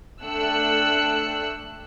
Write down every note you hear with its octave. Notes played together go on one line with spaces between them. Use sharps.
A3 D4 G5 E6 F#6 C#7